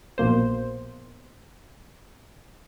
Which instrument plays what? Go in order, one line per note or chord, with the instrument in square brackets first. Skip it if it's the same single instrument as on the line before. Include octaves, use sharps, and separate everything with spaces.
[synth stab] A#1 B2 A#3 C5